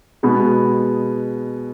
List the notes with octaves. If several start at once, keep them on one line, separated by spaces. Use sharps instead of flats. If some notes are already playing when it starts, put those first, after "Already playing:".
B2 G#3 B3